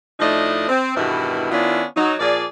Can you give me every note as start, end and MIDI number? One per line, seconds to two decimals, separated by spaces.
0.20 0.66 45
0.20 0.66 53
0.20 0.66 57
0.20 0.66 62
0.20 0.66 63
0.20 0.66 75
0.68 0.94 60
0.96 1.48 40
0.96 1.48 43
0.96 1.48 47
0.96 1.48 51
0.96 1.48 64
1.51 1.84 51
1.51 1.84 59
1.51 1.84 61
1.51 1.84 62
1.51 1.84 64
1.51 1.84 65
1.97 2.15 54
1.97 2.15 63
2.20 2.45 46
2.20 2.45 53
2.20 2.45 68
2.20 2.45 74